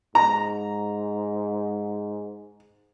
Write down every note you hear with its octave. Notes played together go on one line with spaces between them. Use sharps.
G#2 A#5